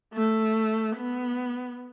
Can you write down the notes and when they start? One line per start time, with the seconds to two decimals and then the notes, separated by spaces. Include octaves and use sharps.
0.13 A3
0.96 B3